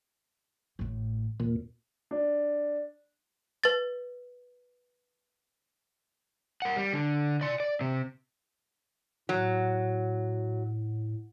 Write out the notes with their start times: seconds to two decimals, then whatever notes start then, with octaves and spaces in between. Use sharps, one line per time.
0.79 A1 A2
1.40 D#1 A#2
2.11 D4
3.64 B4 A6
6.62 A#4 F#5
6.76 G3
6.93 D3
7.41 D5 C6
7.60 D5
7.81 C3 C4
9.29 A2 F#3